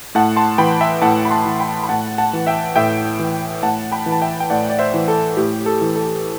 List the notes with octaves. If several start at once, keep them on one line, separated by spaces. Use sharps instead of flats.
A2 F#5 A5
A5 C6
E3 G5 B5
E5 G5
A2 F#5 A5
B5
A5 C6
E3
G5 B5
B5
A2 F#5 A5
F#5 A5
E3
E5 G5
A2 E5 G5
E3
A2 F#5 A5
G5 B5
E3
A5
E5 G5
G5
A2 D5 F#5
D5
C5 E5
E3
A4
A2 G4
A4
E3
A4